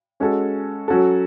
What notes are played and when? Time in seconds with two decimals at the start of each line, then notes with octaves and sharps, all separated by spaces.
0.20 G#3 C#4 F#4 A4
0.88 F#3 C#4 F#4 A4